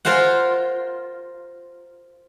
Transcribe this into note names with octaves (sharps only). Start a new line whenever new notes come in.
F4 A#4 C5 F5 F#5